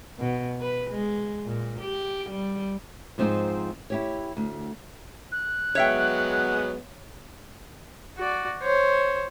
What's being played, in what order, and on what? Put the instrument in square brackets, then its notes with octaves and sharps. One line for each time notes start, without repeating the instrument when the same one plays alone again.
[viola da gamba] B2
B4
G#3
A#2
G4
G3
[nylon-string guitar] G#2 F3 C4 D#4 F4 G#4
E4 G4 C#5
D2
[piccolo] F#6
[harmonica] F#3 G#3 B3 [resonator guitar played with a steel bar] C#5 E5 G5
[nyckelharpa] F#4 D5
C5 C#5